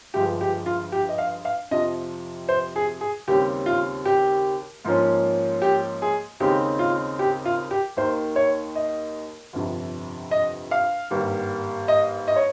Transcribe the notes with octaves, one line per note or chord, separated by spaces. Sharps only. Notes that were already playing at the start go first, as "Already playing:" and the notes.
G1 G2 F3 G#3 G4
G4
F4
G4
D#5
F5
F5
F2 C3 F3 D#5
C5
G#4
G#4
D#2 C#3 G3 C4 G4
F4
G4
G#2 F3 A#3 C#4
G4
G#4
D#2 C#3 G#3 C4 D#4 G4
F4
G4
F4
G4
D#2 D#3 A#3 C5
C#5
D#5
G1 F2 C3
D#5
F5
G#1 G2 G3 A#3
D#5
D#5
C#5